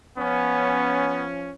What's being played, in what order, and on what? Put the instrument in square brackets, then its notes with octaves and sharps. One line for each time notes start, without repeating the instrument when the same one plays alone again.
[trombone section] F3 C#4 [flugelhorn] B3